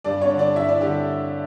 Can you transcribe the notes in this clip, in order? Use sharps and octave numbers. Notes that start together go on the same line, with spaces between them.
G2 D4 D5
C#4 C#5
D3
D4 D5
G2 E4 E5
D4 D5
D3 G4